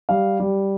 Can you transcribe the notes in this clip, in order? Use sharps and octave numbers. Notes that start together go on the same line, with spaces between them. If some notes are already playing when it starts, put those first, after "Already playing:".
G3 F5
G3